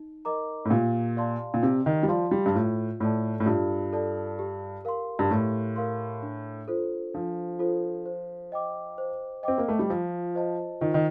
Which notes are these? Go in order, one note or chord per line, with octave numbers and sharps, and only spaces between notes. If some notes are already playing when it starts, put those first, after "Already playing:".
Already playing: D#4
A#4 D#5 A#5 D6
A2
A#2 G4
D5 F5 A5 C6
A#2
C3 G4
D#3
G3
F3 D5 F5 A5 C6
G3
G2
A2 F4
A2 A4 D5 A5
A2
G2 F4
A4 D5 A5
G4
A#4 F5 C6
G2
A2 G4
A#4 F5 C6
D4
F4 A4 C5
F3 D4
F4 A4 C5
C5
D#5 G5 D6
C5
C4 D#5 G5 D6
A#3
A3
G3
F3 F4
C5 D#5 A5
D#3 F4
D#3